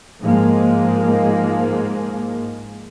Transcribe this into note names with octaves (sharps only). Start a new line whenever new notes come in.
G#2 F3 G#3 A#3